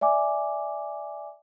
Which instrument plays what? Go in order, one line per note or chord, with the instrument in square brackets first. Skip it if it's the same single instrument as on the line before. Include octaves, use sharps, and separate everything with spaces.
[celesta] D5 E5 G#5 D6